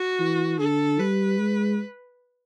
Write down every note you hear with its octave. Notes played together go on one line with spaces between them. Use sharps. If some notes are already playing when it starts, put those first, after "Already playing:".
Already playing: F#4
E3
D3 A4
G3 B4
G#3